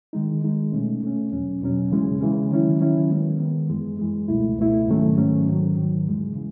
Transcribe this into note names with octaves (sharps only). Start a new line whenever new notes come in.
D#3 G#3 D#4
D#3 G#3 D#4
B2 A3 C#4
B2 A3 C#4
E2 B2 F#3 C#4
E2 B2 F#3 C#4
C#3 E3 G#3 C#4
C#3 E3 G#3 C#4
D#3 F#3 C#4 E4
D#3 F#3 C#4 E4
D#3 G#3 B3
D#3 G#3 B3
F#2 E3 G#3
F#2 E3 G#3
C#2 B2 A3 E4
C#2 B2 A3 E4
G#2 D#3 F#3 A3 C#4
G#2 D#3 F#3 A3 C#4
G#2 D#3 F#3
G#2 D#3 F#3
E2 C#3 E3 G#3
C#3 E3